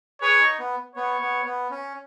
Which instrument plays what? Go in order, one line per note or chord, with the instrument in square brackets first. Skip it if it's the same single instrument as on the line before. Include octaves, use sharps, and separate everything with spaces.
[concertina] G#4 B4 [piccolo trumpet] C#5
[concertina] D#4
B3
[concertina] B3 [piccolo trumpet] C#5
[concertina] B3
B3
C#4